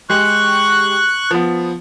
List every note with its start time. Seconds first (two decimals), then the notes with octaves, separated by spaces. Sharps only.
0.10 G#3 G4 C#6 F#6
1.31 F3 B3